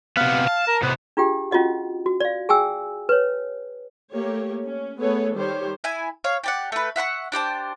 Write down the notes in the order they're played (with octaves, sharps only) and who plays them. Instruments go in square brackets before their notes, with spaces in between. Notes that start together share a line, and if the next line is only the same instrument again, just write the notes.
[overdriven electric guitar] C3 B3 [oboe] F5
[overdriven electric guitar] A5
[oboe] A#4
[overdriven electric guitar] A2 C3 [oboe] B3
[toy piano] D4 F4 G4 G#4 G5
C#4 F4 F#4 D#5 F#5
F#4
D5 F5
G#4 G5 G#5 E6
B4 C#5
[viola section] A3 A#3 G4 C#5
C#4
A3 B3 G#4 A4 B4 C#5
D#3 G3 G4 C5 C#5
[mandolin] E4 G#5
C#5 F5
G4 D5 F#5
A3 B4
E5 F#5 C6 C#6
D4 G4 C5 A5